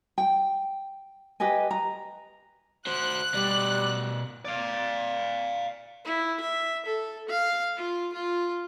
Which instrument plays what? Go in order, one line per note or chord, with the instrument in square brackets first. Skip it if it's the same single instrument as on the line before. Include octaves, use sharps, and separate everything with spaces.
[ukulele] G5
G4 B4 D#5 G#5
A#5
[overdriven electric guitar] F#4 C5 [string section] F#6
[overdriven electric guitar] B2 D5 [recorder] G3
[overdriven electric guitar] D5 F5
[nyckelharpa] E4
E5
A4
F5
F4
F4